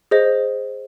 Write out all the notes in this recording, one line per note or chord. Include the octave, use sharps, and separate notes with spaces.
G#4 C5 D#5